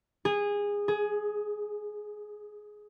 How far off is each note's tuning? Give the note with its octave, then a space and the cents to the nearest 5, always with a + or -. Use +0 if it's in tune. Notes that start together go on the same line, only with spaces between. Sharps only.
G#4 -20
G#4 +15